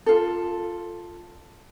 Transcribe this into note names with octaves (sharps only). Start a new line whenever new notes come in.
F4 A4